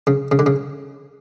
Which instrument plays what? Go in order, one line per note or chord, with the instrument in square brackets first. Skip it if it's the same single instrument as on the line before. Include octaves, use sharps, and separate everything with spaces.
[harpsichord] C#3
C#3
D3
C#3